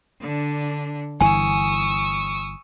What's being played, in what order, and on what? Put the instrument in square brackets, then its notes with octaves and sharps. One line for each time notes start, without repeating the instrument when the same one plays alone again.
[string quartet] D3 D4
[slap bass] G1 E3 [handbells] G#5 [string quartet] C#6 D#6 E6